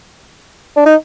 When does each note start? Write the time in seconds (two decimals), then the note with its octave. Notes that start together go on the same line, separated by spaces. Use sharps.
0.76 D4
0.86 D#4